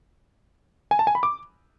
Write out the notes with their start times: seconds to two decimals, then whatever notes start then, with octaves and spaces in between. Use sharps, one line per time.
0.91 G#5
0.99 A5
1.07 G#5
1.15 B5
1.23 D6